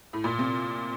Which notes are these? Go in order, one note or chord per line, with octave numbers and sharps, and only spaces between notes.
A2
A#2
C3